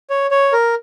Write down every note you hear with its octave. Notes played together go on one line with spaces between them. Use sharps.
C#5
C#5
A#4